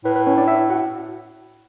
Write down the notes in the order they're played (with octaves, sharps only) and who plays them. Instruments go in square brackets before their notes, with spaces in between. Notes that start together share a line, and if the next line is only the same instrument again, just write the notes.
[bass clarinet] A2 [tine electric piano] B4
[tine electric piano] B4
C#4 C#5
D4 D5
E4 E5
F#4 F#5